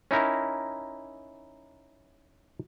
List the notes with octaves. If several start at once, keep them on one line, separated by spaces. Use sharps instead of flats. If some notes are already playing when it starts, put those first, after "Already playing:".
C#4 D#4 E4 A#4